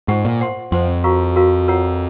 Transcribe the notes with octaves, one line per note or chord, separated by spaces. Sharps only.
G#2 F4 C5 F#5 C#6
A#2
C5 F#5 C6
F2 C5 F#5 C6
F#4 A#4 F5 A#5 C#6
F#4 A#4 F5 A#5 C#6
F4 A#4 C#5 F#5 A#5